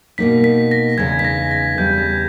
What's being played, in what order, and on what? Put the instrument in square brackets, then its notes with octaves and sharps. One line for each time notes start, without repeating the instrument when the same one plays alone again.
[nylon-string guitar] B2 A#3 D#4 [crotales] B6
[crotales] B6
A#6
[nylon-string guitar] E2 C#3 G#3 D#4 [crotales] G#6
[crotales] B6
A#6
A#6
[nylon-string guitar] E2 C#3 G3 [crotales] G6
[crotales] G#6